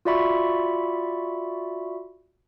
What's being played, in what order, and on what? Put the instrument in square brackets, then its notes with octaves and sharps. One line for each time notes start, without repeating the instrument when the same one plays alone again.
[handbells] F4 F#4 D5 E5 B5 C#6